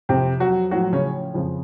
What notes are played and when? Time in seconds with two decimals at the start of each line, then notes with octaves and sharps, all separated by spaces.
0.09 F2 C3 F3 C4
0.40 F#3 F#4
0.71 A2 F3 F#3 F#4
0.93 C#3 C#4
1.34 F2 C#3 F3